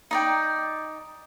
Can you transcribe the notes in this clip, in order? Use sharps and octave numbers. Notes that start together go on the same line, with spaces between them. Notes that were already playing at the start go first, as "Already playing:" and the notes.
D#4 D5 G5